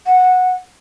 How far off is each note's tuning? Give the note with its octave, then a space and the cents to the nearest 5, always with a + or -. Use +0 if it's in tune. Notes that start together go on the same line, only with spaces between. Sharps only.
F#5 -10